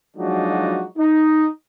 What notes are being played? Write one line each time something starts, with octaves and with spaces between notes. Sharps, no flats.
F3 F#3 G#3 D4 D#4 F#4
D#4